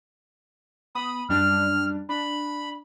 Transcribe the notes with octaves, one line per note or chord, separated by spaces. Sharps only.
B3 B5 D#6
F#2 G3 D4 F6
D4 B5